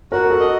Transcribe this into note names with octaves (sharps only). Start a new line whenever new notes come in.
F#4 A#4
A4
D#5